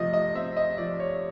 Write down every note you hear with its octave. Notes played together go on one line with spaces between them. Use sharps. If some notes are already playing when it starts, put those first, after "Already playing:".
Already playing: C3 F3 A3 D#5
D#5
C4 E5
D#5
F3 D5
C#5